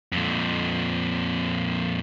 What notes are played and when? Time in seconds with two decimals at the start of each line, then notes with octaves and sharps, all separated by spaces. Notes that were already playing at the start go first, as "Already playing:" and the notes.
0.12 F2 A#2